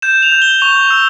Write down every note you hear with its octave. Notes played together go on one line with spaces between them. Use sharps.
G6 E7
F7
G6
G7
C#6 F7
E6